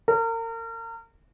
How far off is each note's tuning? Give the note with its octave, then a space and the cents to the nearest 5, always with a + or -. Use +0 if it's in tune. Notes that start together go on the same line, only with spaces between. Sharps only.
A#4 -35